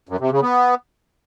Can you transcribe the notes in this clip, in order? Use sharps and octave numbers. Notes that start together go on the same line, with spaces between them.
F#2
C3
C#3
B3